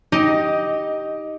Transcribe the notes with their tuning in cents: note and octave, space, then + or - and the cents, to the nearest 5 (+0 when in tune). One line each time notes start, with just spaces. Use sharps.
D#4 +15 G4 +0 D#5 +0